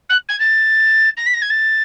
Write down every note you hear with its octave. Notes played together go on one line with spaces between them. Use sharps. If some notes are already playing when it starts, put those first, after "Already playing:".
F#6
G#6
A6
A#6
B6
A#6
G#6
A6